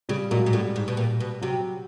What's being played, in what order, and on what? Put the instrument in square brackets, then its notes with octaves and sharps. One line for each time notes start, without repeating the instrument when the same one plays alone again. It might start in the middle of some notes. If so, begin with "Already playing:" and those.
[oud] C#3 [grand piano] G3
[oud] A#2 [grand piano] F#3 G#3
[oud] G#2
[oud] A2 [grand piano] G3
[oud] G#2
B2
A#2
B2
[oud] C3 [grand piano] F#3